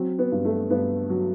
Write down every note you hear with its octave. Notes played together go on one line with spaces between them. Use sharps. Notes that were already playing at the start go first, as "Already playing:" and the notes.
Already playing: F#3 C4
B3
G2
A3
G2 B3
F#3